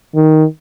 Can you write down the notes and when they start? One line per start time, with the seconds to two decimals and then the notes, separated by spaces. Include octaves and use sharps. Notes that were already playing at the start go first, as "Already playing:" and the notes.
0.15 D#3